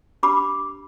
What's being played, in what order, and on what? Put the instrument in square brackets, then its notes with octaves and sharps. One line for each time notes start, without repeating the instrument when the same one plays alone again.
[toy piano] D4 G4 B4 B5 D6